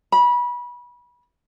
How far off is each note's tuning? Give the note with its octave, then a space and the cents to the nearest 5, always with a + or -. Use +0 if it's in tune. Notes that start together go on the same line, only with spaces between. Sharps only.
B5 -25